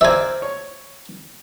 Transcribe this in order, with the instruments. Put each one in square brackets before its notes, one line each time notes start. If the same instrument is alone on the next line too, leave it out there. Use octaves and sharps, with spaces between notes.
[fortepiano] A#4 C5 D5 [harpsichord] E5 G#5
[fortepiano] C#5